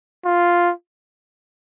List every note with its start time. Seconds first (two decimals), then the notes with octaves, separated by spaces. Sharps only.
0.26 F4